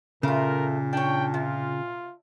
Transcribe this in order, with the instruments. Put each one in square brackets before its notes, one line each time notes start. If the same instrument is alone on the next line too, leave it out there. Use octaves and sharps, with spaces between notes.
[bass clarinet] A#2 [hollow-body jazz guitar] C#3 [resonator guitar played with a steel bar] A3 F4 [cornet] A#4
[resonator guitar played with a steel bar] D4 C#5 [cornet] G5
[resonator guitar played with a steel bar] C3 [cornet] F4